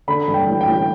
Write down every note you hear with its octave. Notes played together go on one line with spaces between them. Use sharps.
D3 B5
G2
G5
A1
G5
A1